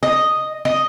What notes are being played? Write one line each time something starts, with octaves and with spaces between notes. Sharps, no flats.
D#5
D#5